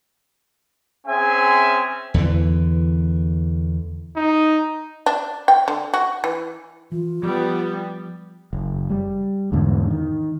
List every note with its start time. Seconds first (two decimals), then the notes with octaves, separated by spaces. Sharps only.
1.06 C4 C#4 G#4 E5 G#5
2.14 E2 D3 E3
4.16 D#4
5.06 D4
5.48 G5
5.68 D3
5.94 F#4
6.24 E3
6.92 E3 F4
7.23 F3 G3 B3
8.53 F#1
8.90 G3
9.52 E2 G#2 D3 B3
9.91 D#3